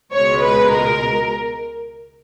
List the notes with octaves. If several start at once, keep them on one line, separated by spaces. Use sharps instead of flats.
C#2 B2 G#3 C#5
B4
A#4